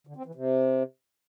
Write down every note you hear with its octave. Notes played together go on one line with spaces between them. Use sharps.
D3
C4
E3
C3